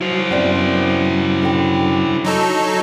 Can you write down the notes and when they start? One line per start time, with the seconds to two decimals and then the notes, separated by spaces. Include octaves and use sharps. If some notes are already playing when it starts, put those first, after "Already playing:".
0.01 F#3 E4 C5
0.31 F#2 B3 C4 D5
1.42 D3 G5
2.25 F#3 D#4 A4
2.63 C#5